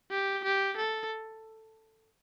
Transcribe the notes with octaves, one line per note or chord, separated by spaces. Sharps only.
G4
G4
A4